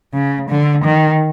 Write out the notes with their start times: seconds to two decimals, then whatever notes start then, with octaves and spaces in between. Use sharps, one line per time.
0.14 C#3
0.50 D3
0.85 D#3